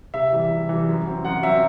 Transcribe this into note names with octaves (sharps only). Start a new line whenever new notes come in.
C3 E5
E3 G3
C3
E3 G3
F#2
F#3 C4
F#2 F#5
F#3 C4 E5